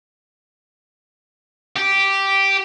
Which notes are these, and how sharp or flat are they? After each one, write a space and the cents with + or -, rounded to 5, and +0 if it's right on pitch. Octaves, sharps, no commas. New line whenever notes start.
G4 -5